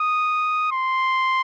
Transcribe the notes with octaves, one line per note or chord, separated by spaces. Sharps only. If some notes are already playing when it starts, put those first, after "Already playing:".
Already playing: D#6
C6